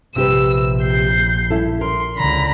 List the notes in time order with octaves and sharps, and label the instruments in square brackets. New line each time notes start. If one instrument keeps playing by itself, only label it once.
[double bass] A#1 [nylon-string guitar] C3 G4 B4 [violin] E6
[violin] G6 C7
[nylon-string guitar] C#4 E4 A4
[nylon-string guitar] A#4 [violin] C6
[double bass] C#2 D3 [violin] A#5 B5